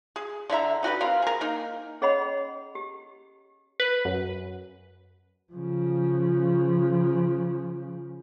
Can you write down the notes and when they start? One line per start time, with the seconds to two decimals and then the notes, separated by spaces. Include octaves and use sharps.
0.16 G#4
0.50 D3 E4 E5 A#5
0.83 D#4 F#4 G4 B4
1.01 C4 A#4 F5
1.22 G#4 A#4
1.41 A#3 D#4
2.01 C#4 G#4 C#5 D#5 F#5 B5
2.75 G4
3.80 B4
4.05 F#2
5.53 C#3 F3